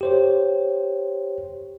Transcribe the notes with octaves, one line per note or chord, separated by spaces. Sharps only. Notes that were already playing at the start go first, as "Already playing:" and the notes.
G4 C5 C#5